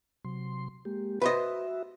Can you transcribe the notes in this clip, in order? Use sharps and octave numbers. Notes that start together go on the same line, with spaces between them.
C3 F#3 C6
G#3 A#3 G4
F#4 B4 C5 D#5 E5